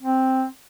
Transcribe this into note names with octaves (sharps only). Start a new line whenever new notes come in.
C4